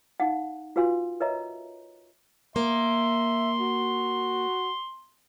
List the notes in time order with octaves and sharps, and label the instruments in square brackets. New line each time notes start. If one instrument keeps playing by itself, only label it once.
[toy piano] D#4 F5 F#5
F4 F#4 B4 F5 G#5 C6
A#4 B4 C#5 D#5 E5 A#5
[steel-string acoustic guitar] A#3 [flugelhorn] E5 [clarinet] C6
[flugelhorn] F#4